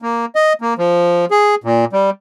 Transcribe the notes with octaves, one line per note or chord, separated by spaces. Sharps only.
A#3
D#5
A#3
F3
G#4
A#2
G3